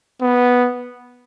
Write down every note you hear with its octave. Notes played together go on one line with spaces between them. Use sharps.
B3